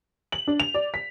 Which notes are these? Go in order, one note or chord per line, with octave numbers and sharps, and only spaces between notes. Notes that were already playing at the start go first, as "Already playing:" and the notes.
F#7
D4
F7
D5
B6